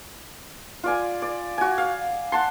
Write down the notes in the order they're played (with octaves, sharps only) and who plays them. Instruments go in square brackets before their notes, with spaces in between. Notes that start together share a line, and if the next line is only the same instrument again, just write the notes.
[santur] F4 D5 G#5
D5
F#4 G#5
F5
F#5 A5 C6